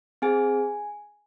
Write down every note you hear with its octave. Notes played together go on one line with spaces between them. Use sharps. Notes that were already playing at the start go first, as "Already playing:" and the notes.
C4 G#4 G#5